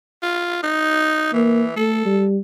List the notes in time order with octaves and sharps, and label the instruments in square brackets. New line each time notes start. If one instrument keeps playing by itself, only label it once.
[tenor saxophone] F4
D#4
[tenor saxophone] E3 [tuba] A#3
[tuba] A3 [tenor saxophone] A4
[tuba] G3